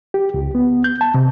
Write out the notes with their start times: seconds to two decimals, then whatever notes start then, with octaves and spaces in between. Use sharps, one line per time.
0.14 G4
0.34 C#2
0.55 B3
0.84 G6
1.01 A5
1.14 C3